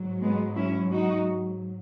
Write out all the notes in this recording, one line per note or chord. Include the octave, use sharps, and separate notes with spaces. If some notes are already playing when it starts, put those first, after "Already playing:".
Already playing: G#2 F#3
G#3 B3
C#4 E4
D#4 F#4